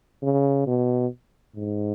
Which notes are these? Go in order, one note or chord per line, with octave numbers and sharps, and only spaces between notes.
C#3
B2
G#2